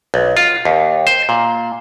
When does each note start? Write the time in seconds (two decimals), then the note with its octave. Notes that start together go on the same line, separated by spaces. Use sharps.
0.14 B1
0.37 F4
0.65 D#2
1.07 C5
1.29 A#2